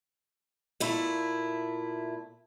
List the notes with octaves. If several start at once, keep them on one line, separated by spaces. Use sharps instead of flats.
A#2 A3 E4